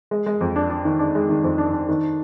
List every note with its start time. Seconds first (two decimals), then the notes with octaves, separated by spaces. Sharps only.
0.11 G#3
0.26 G#3
0.41 F2
0.56 D4
0.70 D4
0.85 D#3
0.99 D4
1.15 G#3
1.29 D#3
1.44 F2
1.58 D4
1.73 D4
1.89 D#3